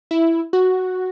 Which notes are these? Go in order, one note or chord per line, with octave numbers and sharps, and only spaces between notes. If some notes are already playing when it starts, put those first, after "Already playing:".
E4
F#4